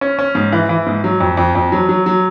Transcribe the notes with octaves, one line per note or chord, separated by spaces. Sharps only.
C#4
C#4
G#2
E3
E3
G#2
F#3
F2
F2
F2
F#3
F#3
F#3